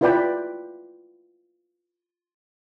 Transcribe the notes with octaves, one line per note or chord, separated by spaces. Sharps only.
E4 F4 B4 D5 G5 B5